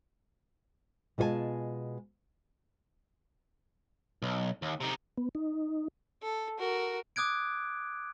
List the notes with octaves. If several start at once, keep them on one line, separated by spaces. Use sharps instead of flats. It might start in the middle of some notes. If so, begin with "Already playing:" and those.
B2 G#3 F4 C5 G#5 A5
B1
D#2
C3 D#4
B3
D#4
A4
F#4 A#4
D6 D#6 F#6 G#6 D7